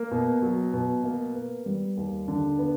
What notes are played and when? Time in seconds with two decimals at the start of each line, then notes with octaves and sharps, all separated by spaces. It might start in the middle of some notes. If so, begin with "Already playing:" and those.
Already playing: A#3
0.11 B2
0.42 F#3
0.74 B2
1.04 A#3
1.35 B3
1.66 G3
1.97 D#2
2.28 D3
2.59 B3